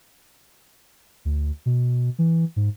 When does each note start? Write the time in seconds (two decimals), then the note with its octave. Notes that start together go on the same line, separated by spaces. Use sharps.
1.25 D2
1.66 B2
2.19 E3
2.56 G#2